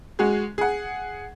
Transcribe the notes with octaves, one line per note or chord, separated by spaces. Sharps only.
G#3 F#4 G#4
G#4 F#5